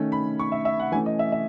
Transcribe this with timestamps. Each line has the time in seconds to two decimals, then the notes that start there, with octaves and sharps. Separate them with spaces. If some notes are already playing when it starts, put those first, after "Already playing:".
Already playing: D#3 A3 C#4
0.12 B5
0.39 C#6
0.52 E5
0.65 E5
0.80 F#5
0.92 E3 A3 C#4 G#5
1.06 D#5
1.19 E5
1.32 E5